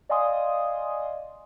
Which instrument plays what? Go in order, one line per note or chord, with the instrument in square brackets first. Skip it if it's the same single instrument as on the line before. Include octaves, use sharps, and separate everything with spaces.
[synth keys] D5 D#5 F5 G#5 C6 D#6